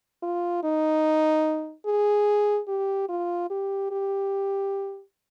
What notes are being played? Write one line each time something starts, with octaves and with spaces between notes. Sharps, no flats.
F4
D#4
G#4
G4
F4
G4
G4